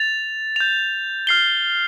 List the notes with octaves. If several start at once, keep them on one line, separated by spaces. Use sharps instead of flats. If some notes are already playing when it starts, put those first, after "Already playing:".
Already playing: A6 F7
G6 F7
F6 C7 G7